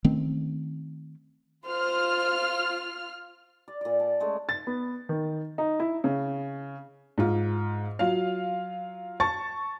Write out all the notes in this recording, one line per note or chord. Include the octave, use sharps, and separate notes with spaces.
D#3 A3 C4 C#4
F4 C5 F6
D5
A#2 D5
A5
G#3 A3 C#4
A6
B3
D#3
D#4
E4
C#3
G#2 F4
F#3 F4 F5
A5 C#6 A6